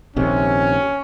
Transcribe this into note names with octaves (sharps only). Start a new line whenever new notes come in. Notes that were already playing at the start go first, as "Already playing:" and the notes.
A#1 C3 D#3 C#4